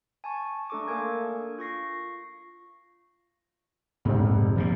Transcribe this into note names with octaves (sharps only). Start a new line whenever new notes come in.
G#5 A5 C#6
A3 D4 A4 C#6 D6
A#3 D4 A4 A#4 G#5 G#6
F4 C#6 A#6 C7
F1 A#1 G#2
E3 F3 A#3